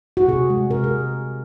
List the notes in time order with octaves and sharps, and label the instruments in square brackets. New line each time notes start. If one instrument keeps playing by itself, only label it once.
[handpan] F#4
C3 G#4
G#3
C3 A#4
G#4